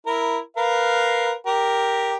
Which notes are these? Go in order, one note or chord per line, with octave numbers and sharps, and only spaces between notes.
E4 A#4
A#4 B4 F5
G4 A#4